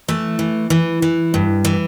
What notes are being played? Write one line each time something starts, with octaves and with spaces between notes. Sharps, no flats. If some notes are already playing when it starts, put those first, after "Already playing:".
E3 A3
E3
E3
E3
G2
E3